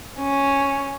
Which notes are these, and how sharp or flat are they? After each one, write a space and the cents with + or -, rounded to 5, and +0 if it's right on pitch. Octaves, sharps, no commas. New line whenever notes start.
C#4 +0